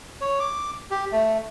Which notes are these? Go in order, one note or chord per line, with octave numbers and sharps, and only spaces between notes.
C#5
D6
G4
A3